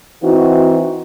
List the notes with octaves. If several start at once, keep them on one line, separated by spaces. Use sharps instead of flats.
E3 C4 D#4 F#4